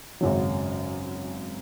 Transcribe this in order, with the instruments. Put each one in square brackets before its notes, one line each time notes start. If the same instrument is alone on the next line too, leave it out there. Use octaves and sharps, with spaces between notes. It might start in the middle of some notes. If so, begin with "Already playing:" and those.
[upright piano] G#1 F#2 C#3 F#3